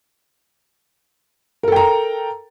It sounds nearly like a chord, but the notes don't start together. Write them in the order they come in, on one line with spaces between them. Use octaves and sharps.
A#4 A4 G5 A#5